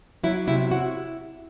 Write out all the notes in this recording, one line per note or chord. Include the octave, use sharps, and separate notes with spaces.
F#3 E4
C3 E4
E4 F#4